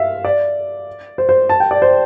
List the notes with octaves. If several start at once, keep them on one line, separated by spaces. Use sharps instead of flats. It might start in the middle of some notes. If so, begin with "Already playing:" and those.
Already playing: E5 F5
D5
C5
C5
A5
G5
D5
C5